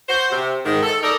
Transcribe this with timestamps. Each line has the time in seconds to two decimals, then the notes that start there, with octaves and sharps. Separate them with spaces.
0.09 F#4 C5
0.32 C3
0.65 G#2 D#3
0.83 A4
1.02 D#4 A4 A#4 D5 D#5